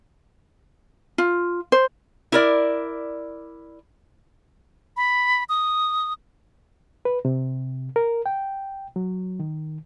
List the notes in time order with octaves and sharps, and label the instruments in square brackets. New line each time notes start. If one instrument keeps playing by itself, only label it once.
[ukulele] F4
C5
[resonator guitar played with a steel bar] E4 A#4 D5
[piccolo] B5
D#6
[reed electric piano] B4
C3
A#4
G5
F#3
D#3